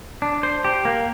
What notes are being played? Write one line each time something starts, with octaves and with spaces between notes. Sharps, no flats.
D4
C5
G4
A#3